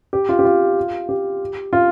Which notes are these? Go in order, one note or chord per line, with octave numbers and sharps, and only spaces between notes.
G4
F4
G4
F4
G4
F4